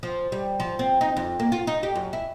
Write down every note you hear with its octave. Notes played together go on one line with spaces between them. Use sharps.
F3
G3
F3
C4
D#4
F2
A#3
F4
D#4
G4
F#2
E4